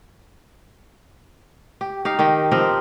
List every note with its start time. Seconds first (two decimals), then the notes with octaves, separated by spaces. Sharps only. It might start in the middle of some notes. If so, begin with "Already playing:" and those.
1.81 G4
2.05 D#4 G4 F5
2.19 D#3 G4 G5
2.51 F3 C4 G4 A#4